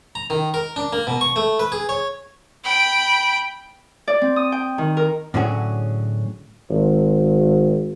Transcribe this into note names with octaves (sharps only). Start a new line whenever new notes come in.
A#5
D#3
A#4
D4
A#3
B2
C#6
A3
B4
G#4
C#5
G5 B5
D5
C4
D#6
G5
D#3
A#4
A2 D3 F#3 C#4 F#4 G#4
G#1